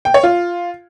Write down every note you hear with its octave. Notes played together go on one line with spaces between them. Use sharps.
G5
C#5
F4